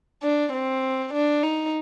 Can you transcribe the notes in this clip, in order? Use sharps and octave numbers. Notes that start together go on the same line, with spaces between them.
D4
C4
D4
D#4